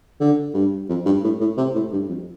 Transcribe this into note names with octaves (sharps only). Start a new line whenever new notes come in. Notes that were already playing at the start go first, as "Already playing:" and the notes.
D3
G2
F2
G2
A2
A2
C3
A2
G2
F2